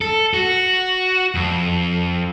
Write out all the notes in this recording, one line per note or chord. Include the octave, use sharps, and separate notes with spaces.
A4
F#4
F2